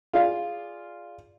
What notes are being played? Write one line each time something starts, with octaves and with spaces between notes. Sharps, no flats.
F4 G#4 D5 F5